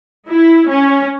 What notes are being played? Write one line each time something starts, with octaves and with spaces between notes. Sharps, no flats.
E4
C#4